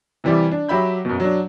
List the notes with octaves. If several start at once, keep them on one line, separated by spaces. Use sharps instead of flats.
C3 E3 G3 E4 G4
D4
F#3 G4 E5 B5 G6
F#2 B2
F#3 D4